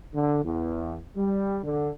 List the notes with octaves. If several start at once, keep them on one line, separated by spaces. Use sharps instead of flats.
D3
E2
G3
D3